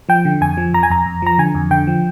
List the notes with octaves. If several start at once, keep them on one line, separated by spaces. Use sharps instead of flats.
F3 G5
D3
F2 G#5
F3
F2 A#5
G#5
F2 A#5
F2
F3 A#5
D3 G#5
F2
D3 G5
F3